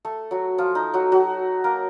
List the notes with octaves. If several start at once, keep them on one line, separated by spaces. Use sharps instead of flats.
A3 A4
F#3 F#4
F3 F4
D#4
F#3 F#4
F#3 F#4
A#3 A#4